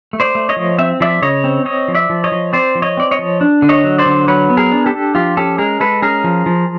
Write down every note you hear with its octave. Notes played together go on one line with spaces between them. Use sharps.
A3
C5 D5
A3
C#5 D#5
F3
C4 E5
F3 D5 E5
C#3 C#5 D#5
C4
C4 C#5 D#5
F3
D5 E5
F3
C#5 D#5
F3
C4 C5 D5
F3
C#5 D#5
C4 D5
C#5 D#5
F3
D4
D3
C#5 D#5
F#3
C5 D5
D3
F#3 B4 C#5
B3
G#4 A#4
D4
G4 A4
D4
F3 F4 G4
C#4 G4 A4
G#3 G#4 A#4
G#3 A4 B4
C#4 G#4 A#4
F3
F3